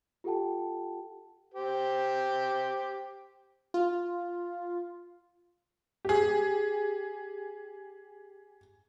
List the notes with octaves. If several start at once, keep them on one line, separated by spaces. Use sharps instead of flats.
F4 G4 A4 F#5 G5 A5
G4 C5
F4
G4 G#4